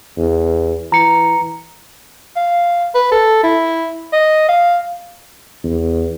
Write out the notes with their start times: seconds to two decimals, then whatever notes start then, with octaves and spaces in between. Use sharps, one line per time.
0.17 E2
0.92 E3 A#5 C#7
2.37 F5
2.95 B4
3.12 A4
3.43 E4
4.13 D#5
4.49 F5
5.64 E2